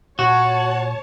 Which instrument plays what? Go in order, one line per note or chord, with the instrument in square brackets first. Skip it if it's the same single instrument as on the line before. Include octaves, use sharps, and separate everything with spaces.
[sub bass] A#2 [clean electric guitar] F#4 [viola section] C#5 A5